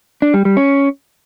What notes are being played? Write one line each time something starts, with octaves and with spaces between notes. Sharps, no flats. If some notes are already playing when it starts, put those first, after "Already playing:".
D4
G3
G3
C#4